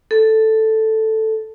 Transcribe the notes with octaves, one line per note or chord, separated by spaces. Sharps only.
A4